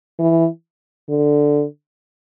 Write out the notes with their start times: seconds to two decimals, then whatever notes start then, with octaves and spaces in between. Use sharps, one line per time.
0.19 E3
1.09 D3